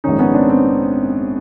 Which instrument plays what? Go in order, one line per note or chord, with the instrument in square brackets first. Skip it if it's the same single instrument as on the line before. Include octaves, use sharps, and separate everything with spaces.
[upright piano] A#1 G#2 D#3 C#4 D#4
B3 C#4
C4 D4
C4